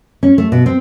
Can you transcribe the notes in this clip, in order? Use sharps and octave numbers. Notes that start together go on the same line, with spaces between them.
C#4
A3
B2
C4